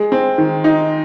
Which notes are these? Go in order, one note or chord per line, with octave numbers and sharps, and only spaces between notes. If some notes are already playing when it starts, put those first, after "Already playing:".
Already playing: G#3
C4
D#3
D#4